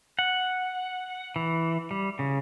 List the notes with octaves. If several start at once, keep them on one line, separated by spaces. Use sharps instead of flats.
F#5
E3
G3
C#3